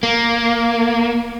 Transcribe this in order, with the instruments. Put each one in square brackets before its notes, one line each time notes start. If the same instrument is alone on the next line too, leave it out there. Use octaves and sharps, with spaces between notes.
[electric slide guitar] A#3